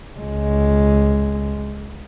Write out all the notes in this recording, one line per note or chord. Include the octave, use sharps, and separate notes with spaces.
C#2 G#3